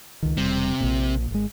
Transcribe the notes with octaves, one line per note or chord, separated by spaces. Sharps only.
C#2 D#3
E1 C3 G3
A#1 A#2
G#1 G#3